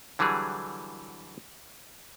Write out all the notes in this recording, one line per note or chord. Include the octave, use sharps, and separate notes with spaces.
D3 E3 F#3 G3 G#4